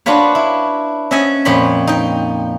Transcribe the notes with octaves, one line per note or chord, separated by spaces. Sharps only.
D4 F4 F#4 B4 C#5
E4
C#4 D#5 E5 F#5 G#5
F2 A#2 C#5 B5 C6
D#4 G5